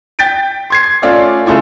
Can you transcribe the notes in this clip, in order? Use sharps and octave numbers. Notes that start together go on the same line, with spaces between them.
G5 G6 A6 B6 D7
C6 G#6 C7
A3 C#4 F4 D5 F5
C#3 G#3 A3 E4 F4